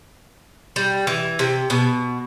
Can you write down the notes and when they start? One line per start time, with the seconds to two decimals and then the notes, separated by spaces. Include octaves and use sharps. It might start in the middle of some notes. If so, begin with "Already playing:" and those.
0.76 G3
1.07 E3
1.39 C3
1.70 B2